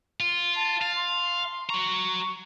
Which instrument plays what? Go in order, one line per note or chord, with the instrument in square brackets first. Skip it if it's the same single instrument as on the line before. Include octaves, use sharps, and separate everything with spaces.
[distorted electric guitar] F4
[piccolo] A5
[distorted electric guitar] F5
[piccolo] C6
[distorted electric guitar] F#4 A#5 [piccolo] C#6